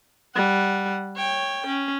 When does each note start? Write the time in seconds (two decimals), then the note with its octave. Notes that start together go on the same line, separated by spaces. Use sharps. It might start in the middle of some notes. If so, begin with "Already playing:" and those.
0.36 G3 F#5
1.16 C#5 G5
1.67 C#4